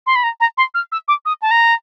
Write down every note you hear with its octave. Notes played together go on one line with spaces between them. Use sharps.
C6
B5
A#5
A#5
C6
F6
E6
D6
D#6
A5
A#5